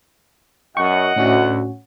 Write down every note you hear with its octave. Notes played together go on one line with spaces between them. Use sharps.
F#2 D#5 F#5 C#6
D2 A2 C#4 F#4